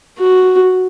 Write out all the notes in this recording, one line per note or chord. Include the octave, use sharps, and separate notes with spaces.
F#4